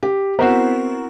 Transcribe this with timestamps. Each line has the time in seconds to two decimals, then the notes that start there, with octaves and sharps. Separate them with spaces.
0.03 G4
0.39 B3 C4 E4 F#4 A#4 C5